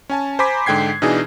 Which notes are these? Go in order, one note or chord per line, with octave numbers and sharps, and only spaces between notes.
C#4 G#5 A5
C5 G#5 A#5 B5 D6 B6
G#2 D3 G5 G#6 C7
B2 E3 D4 D#4 G#4